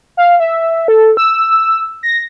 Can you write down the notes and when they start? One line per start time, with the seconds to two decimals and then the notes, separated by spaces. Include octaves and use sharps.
0.17 F5
0.40 E5
0.88 A4
1.17 E6
2.03 A#6